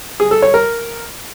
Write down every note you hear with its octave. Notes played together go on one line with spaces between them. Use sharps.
G#4
A4
C#5
A#4